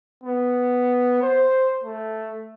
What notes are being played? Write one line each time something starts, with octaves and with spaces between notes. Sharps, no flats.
B3
C5
A3